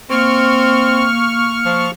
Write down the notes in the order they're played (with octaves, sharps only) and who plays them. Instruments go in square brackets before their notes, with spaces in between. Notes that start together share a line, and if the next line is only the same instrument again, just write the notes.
[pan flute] A#3 [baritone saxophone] C4 [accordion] C#6 F6
[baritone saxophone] F3